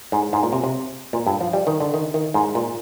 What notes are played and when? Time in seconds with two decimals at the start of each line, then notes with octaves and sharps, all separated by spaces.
0.12 G#2
0.33 G#2
0.43 A#2
0.53 C3
0.64 C3
1.13 A#2
1.27 G2
1.41 F3
1.53 G3
1.67 D#3
1.80 D3
1.94 D#3
2.14 D#3
2.34 G#2
2.55 A#2